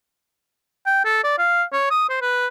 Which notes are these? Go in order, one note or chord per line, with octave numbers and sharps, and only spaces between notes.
G5
A4
D5
F5
C#5
D#6
C5
B4